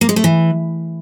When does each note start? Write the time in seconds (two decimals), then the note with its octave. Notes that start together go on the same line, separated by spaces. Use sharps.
0.01 A#3
0.09 G#3
0.16 A3
0.24 E3